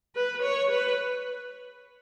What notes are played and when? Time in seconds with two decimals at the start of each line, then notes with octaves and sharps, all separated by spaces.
0.15 B4
0.43 C#5
0.71 B4